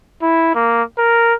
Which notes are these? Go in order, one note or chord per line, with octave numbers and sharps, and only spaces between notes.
E4
A#3
A#4